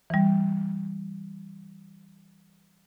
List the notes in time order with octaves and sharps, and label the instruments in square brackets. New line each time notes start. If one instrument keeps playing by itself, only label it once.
[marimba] E3 G3